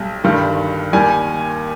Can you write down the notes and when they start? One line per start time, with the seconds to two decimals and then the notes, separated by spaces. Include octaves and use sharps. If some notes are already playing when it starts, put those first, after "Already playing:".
Already playing: B1 G3
0.24 G1 G2 D#3 G3
0.92 D#2 D#3 G3 G#5